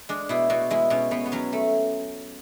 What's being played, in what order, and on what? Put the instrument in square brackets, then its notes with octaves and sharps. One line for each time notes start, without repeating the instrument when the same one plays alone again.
[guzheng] G#3 D4
B2 E4
B2 F#4
G#3 E4
B2 C#4
B2 B3
B3
F#3 C#4
A3